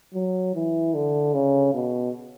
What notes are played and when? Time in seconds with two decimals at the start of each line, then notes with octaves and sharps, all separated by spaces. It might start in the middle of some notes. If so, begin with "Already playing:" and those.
0.14 F#3
0.54 E3
0.94 D3
1.34 C#3
1.74 B2